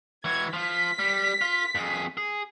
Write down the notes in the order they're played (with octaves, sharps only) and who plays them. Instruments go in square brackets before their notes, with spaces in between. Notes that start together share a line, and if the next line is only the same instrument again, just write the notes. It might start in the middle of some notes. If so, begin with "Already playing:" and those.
[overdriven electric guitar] E3 F#4 [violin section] G#6
[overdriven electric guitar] F3 F4 [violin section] B6
[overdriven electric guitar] G3
F4
F2 G#4
G#4